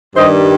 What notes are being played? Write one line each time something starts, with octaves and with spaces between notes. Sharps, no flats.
G2 D#3 G3 C5 D#5